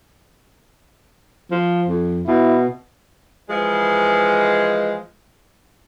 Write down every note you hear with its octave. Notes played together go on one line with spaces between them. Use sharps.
F3
F2
B2 E4
E3 F3 G#3